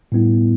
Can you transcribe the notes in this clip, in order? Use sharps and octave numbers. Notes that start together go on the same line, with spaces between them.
A2 G3 B3 E4